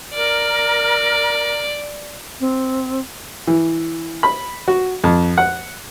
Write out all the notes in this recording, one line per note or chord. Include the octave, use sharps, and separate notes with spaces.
A#4 D5 F6
C4
E3
B5
F#4
F2
F#5